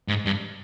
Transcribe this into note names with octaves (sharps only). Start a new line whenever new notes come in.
G#2
G2